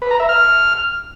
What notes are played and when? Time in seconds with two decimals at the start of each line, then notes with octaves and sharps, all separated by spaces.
0.02 B4
0.11 A#5
0.20 E5
0.29 F6